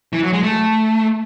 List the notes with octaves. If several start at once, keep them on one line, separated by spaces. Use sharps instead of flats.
E3
F#3
G#3
A3